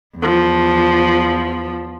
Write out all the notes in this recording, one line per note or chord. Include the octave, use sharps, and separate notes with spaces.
E2 F3